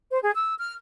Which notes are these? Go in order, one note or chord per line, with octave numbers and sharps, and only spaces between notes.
C5
G#4
E6
F6